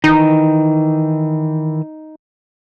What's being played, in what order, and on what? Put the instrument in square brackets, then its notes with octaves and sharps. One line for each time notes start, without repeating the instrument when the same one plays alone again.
[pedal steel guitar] D#3 E3 [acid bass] D#4